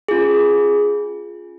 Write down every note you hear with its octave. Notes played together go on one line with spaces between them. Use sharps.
C#4 F4 G#4